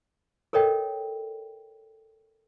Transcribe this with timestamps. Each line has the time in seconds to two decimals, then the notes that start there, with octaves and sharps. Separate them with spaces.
0.53 A4 A#4 C#5 D#5 G5